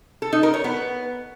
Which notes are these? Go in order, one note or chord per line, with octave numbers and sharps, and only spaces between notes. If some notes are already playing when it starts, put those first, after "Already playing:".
A4
D#4
A#4
C#5
B3